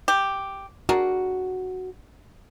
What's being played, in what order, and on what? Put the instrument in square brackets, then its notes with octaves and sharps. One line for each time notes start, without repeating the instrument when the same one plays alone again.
[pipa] G4
[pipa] D4 G#4 A#4 [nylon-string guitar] F#4